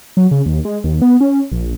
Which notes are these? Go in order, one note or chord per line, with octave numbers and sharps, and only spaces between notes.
F#3
C#3
D#2
G#3
D#2
B3
C#4
A#1